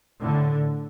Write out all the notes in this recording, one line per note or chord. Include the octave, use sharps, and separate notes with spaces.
A2 D3